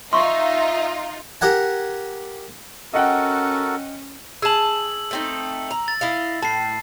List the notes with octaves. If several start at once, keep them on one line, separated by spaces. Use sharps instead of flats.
D#4 F4 E5 C6 C#6
G4 A#4 F#5 G#5
C#4 F#4 A4 A#4 D#5 F#5 G5
G#4 A5 E6 F#7
A3 C4 D#4
A#5
A6
E4 D#5 F5
A2 A5 C7